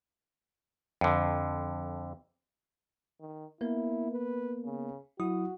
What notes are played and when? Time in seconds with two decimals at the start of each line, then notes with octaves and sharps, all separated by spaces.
1.01 F2 D3
3.20 D#3
3.61 A#3 B3 E4 A#4
4.12 B4
4.65 C#3
5.20 F#3 E4 F#4 D#6